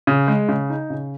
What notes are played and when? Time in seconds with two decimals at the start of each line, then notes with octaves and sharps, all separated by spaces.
0.07 C#3
0.28 G#3
0.49 C#3
0.70 D#4
0.90 C#3